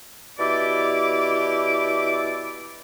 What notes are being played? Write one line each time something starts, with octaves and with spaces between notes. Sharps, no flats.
B2 E4 G4 D5 D6